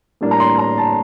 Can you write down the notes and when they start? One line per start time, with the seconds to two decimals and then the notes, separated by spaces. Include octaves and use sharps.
0.21 A2 G3 A#3 D4
0.31 A#5
0.40 C6
0.58 A#5
0.78 A5